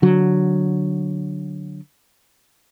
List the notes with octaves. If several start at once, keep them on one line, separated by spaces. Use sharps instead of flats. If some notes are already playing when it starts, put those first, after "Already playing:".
D3 F#3